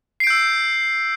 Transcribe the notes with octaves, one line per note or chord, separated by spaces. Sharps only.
E6 G6 C7 D7